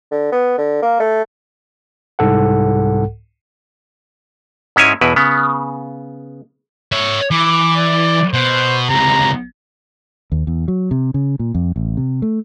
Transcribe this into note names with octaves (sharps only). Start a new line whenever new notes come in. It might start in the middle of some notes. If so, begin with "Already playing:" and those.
D3
B3
D3
A#3
A3
C2 G#2 A4 F#5
G#2 G#3 C#4 E4 C#5 G#5
E2 B2 E4 B4
C#3 B3
C#5 E5
E3 D6
D5
B2 C5
C#2 C3 A#5
D#2
E2
F#3
C3
C#3
A#2
F2
A1
C3
A3